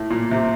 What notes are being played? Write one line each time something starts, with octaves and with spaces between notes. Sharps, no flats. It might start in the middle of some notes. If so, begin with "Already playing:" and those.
Already playing: A2
A#2
C3